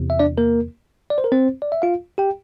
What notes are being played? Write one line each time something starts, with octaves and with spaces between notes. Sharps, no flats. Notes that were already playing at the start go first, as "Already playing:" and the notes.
Already playing: E2 C3
E5
D4 D5
A#3 A#4
D5
C5
A#4
C4 C5
D5
E5
F4 F5
G4 G5